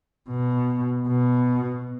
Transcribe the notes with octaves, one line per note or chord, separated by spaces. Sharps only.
B2
B2